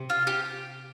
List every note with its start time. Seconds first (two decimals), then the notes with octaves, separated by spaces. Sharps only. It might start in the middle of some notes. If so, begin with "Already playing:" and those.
Already playing: C3
0.10 F4
0.27 G4